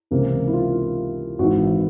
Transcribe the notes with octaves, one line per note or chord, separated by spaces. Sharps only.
C#2 C3 E3 A#3
E4
F4
G#1 G#2 E3 F#4